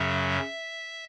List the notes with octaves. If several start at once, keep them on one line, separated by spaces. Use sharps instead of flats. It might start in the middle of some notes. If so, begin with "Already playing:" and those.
Already playing: F#2 C#3 F#3 C#4 E5